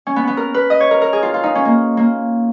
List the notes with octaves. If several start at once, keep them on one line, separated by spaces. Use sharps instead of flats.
C#4
B3
B3
A#4
B4
D#5
C#5
A#4
A#4
G#4
F4
F4
D#4
C#4
A#3
A#3